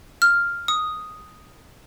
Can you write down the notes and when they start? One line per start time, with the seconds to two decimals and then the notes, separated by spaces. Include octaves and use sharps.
0.22 F6
0.68 D#6